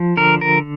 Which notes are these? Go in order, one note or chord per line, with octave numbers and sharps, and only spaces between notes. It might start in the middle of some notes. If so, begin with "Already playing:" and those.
Already playing: F3
D3 A#4
A#4